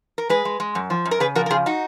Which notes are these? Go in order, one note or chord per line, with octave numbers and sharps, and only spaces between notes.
A#4
G#3 G#4 B4
G#3
G#3
F#2
F3
F#2
A#4
C#3 G#4 B4
F3 F#4 A#4
A#4
C#3 F4 G#4
D#4 F#4